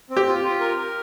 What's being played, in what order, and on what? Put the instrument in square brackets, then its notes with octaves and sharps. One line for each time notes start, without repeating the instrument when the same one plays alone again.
[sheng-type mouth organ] C4
[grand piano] G4
[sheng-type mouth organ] F4
F4
A#4
A#4